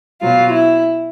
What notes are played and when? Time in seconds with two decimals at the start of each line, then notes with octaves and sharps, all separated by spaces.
0.22 B2 F#3 F4
0.53 E4